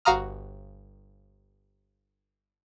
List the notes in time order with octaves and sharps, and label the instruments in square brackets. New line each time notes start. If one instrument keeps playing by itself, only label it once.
[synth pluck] G1 F#4 F5 A#5 D#6 F6